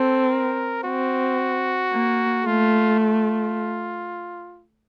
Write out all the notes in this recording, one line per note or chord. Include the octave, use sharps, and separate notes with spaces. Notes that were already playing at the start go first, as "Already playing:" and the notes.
Already playing: C4 A4
A#4
C4 F#4
A#3
A3 F4
F4